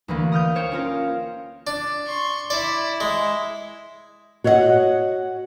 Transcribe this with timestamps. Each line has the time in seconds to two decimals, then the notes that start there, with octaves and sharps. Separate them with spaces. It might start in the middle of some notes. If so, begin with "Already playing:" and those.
0.08 D2 E3 A#3
0.32 D#6 F6 G6
0.55 C5 C#5 G5
0.72 C#4 F4 A#4
1.67 D4
2.06 C6 C#6
2.50 E4 D5
3.01 G#3
4.44 F#4 C#5 D#5 E5 F#5